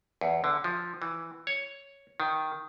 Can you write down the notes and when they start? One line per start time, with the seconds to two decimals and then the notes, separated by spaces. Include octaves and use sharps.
0.21 E2
0.44 D3
0.64 F3
1.02 E3
1.47 C#5
2.20 D#3